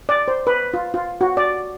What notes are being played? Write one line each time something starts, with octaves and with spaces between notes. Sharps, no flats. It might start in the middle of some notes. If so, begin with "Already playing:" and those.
D5
C5
B4
F4
F4
F#4
D5